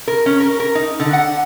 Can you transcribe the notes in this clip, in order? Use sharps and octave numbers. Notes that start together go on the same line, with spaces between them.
A#4
C#4
A#4
A#4
D#4
D3
F#5